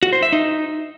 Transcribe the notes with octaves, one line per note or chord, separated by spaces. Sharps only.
F#4
C5
E5
D#4